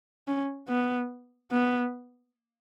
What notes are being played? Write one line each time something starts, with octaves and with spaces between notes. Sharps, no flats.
C#4
B3
B3